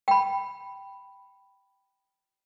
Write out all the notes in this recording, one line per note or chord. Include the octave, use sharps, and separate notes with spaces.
G5 B5